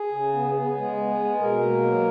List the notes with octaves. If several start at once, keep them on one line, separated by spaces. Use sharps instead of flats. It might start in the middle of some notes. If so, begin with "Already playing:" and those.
Already playing: G#4
C#3
B3
B3 G#4
G#3
B3
G#3
B2 A#4
A#3
F#3